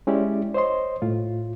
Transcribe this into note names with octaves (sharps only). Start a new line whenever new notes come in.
G#3 C#4 E4 G4 D5
C5 C#5 D#5 C6
A2 F4